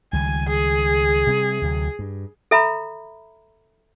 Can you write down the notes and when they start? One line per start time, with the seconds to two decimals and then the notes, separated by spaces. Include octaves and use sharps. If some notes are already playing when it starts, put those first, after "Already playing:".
0.13 C#2 D#3 G3 G#5
0.49 G#4
1.27 C3 G3 C4
1.61 D2 C3 F#3
1.99 G2
2.51 A4 E5 A#5 B5